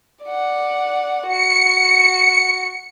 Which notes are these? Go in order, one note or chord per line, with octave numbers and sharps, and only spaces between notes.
D5 F#5
F#4 C#7